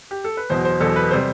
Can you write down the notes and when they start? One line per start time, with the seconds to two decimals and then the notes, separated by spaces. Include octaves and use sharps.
0.11 G4
0.24 A4
0.37 B4
0.50 E2 B2 F#3 C5
0.65 C5
0.80 E2 B2 F#3 A4
0.96 B4
1.11 C3 G3 C5